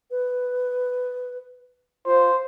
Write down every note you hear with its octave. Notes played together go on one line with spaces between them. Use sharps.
B4
F4 C5